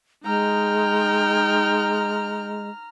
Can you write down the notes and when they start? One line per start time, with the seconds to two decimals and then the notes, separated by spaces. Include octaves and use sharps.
0.24 G#3 D#4 G5 A#5 F6